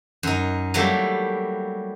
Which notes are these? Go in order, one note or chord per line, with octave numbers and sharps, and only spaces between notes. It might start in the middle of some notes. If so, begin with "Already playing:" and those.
F#2 D#4
F#3 G3 A3 A#3 E4 G4